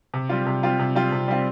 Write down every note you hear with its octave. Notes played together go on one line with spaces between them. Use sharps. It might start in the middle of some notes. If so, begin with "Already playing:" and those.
C3
G3 C4 F4
C3
G3 C4 F4
C3
G3 C4 F4
C3
G3 C4 F4